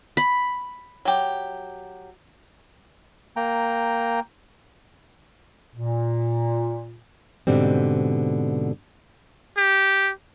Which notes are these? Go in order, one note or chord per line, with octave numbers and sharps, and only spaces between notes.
B5
F#3 G4
A#3 G5 A#5
A#2
G#2 B2 D3 G3 C4
G4